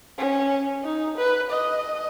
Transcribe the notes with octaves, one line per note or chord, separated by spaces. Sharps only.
C#4
D#4
B4
D#5